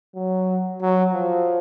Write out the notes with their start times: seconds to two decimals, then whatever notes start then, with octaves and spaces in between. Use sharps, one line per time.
0.16 F#3
0.81 F#3
1.13 F3